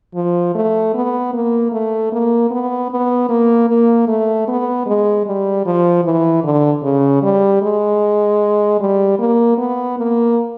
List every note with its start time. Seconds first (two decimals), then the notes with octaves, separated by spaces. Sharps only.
0.15 F3
0.55 A3
0.94 B3
1.33 A#3
1.72 A3
2.12 A#3
2.50 B3
2.91 B3
3.29 A#3
3.69 A#3
4.08 A3
4.48 B3
4.86 G#3
5.27 G3
5.66 F3
6.04 E3
6.44 D3
6.83 C#3
7.22 G3
7.62 G#3
8.80 G3
9.19 A#3
9.58 B3
9.98 A#3